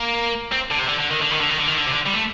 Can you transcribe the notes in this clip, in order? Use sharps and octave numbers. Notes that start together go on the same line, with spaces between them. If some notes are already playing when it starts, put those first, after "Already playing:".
Already playing: A#3
C4
D3
C3
D3
D3
D#3
D3
D#3
D3
D#3
D3
D#3
D3
C3
D3
G3
A3